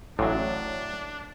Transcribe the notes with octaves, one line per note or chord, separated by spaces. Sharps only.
A1 A2 F#3 D4